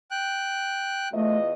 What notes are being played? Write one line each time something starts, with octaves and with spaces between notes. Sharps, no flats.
G5 F#6
E2 A3 F4 D#5